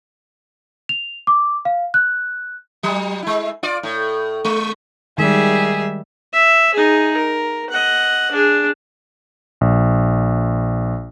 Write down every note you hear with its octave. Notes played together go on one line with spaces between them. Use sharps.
F7
D6
F5
F#6
F#3 G3
G#3 E4
F4 D5
A2
G#3
D#3 G3 G#3 G#4 E5
E5
D#4 G#4
A#4
D#5 F#5
D4 G#4
A#1